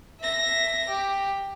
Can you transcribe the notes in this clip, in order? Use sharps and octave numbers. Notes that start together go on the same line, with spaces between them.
E5 A#6
G4